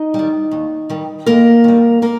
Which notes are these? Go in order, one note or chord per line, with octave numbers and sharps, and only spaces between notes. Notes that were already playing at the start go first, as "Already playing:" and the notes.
Already playing: D#4 D#5
D#3 G3
D#2
D#3 G3
D#2 A#3 A#4
D#3 G3
A#3 A#4